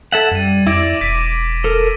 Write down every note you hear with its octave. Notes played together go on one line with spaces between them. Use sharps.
A4 E5 F#5 G#6 F#7
F#2 G3 A6 D#7
F2 E4 D5 D6 A#6 D7
E1 D6 B6 D#7
A4 A#4